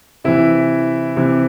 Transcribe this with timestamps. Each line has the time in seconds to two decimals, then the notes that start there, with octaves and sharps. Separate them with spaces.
0.24 C3 E3 E4
1.16 C3 E3